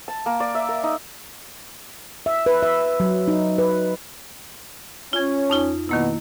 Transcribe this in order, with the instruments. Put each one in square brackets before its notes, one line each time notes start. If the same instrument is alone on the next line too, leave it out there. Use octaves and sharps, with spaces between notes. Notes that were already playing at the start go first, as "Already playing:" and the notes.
[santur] A5
A#3
D5
E5
A#4
D#4
[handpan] E5
B4
E5
F#3
D#4
B4
[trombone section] C#4 [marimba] F4 G#6
[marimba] F2 D#4 F4
[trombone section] B2 [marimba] D#3 A#3 E4